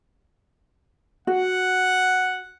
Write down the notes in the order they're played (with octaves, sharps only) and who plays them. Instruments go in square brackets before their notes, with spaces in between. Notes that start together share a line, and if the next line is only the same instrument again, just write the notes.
[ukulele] F#4 [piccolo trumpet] F#5